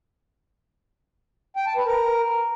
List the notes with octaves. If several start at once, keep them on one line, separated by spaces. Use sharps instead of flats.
G5
A5
B4
A#4